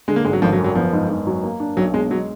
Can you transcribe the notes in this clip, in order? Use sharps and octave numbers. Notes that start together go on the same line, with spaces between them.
D3 G#3
A#3
G#1 G#3
F#3
G#1 F3
F#3
F#2
F#3
F3 B3
G#2
G#2
F#3
A#3
D4
B1 F#3
B2 G#3
F#3 G#3